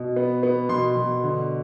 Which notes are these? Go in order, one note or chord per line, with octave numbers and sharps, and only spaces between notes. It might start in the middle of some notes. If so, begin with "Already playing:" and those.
Already playing: B2
B3
B3
B2 C6
B2
D3